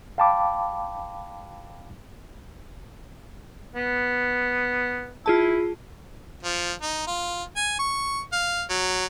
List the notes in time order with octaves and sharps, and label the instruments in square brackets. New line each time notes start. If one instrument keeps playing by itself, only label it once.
[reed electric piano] F5 G5 A5 B5 D6
[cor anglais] B3
[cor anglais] E4 [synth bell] F4 G#4 A5
[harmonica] F3
D#4
F4
G#5
C#6
F5
F#3